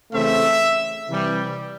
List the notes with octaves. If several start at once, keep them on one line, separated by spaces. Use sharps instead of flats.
C#3 E3 A3 C4 E5
C3 E3 G3